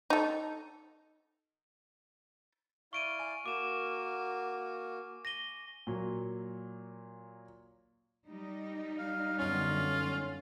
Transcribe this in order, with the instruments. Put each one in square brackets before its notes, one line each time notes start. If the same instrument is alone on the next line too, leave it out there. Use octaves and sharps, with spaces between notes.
[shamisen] D#4 A4
[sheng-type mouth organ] E4 D5 F5 [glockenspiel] C#6 D7 D#7
[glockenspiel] G#5
[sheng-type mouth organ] A#3 F#4 [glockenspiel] D6 E7
[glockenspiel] A#6 D#7 G7
[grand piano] A#2 F#3
[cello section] G3 D#4
[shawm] F5
[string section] F#2 D3 B3 [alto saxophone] C#4 [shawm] F4